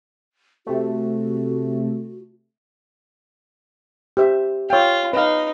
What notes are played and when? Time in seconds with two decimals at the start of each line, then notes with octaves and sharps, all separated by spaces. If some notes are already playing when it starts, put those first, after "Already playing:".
0.67 C3 A3 F#4
4.17 G4 C5 E5
4.70 F4 C#5 G5
5.13 D#4 B4 F5